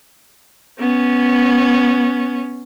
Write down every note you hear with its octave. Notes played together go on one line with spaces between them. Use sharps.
B3 C#4